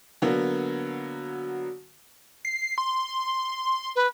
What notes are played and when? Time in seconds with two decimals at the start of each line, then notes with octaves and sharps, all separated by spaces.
0.22 D3 F#3 A#3 B3
2.45 C7
2.78 C6
3.96 B4